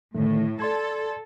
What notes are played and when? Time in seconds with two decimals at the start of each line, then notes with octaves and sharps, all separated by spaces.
0.15 A2 D3 D#3 A3
0.60 A4 D5 C6 G#6